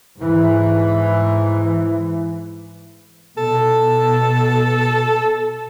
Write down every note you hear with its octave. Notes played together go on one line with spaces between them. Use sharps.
G#2 E3
B2 A4